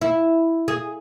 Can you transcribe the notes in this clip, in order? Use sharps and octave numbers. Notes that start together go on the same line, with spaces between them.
E4
G#4